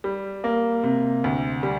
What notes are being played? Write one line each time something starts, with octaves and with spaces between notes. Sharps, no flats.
G3
A#3
C3
D2
G3